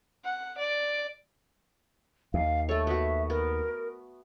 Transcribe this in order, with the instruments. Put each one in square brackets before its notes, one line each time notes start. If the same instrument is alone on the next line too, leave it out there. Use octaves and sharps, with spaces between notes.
[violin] F#5
D5
[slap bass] D#2 [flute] F5
[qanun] A3 C#5 [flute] A4
[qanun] B3 F#4 [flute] E5
[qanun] B3 [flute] A#4